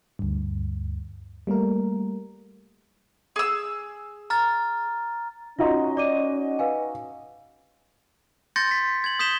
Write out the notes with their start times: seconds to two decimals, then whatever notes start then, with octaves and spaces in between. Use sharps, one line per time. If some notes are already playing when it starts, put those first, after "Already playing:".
0.19 D2 G2
1.47 G3 A3 A#3 A#4
3.36 G#4 E6
4.30 A#5 F6 A6
5.59 C#4 D#4 F4 F#4 D#5 A#5 C6
5.97 D5 D6 D#7
6.59 B4 F5 G#5
8.56 C6 G6 A6 A#6 C#7
8.71 B6
9.04 G#6 F#7
9.19 D#6 G6 B6 E7 G7